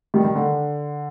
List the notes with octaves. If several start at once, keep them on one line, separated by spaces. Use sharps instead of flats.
D#3 G3
D#3
D3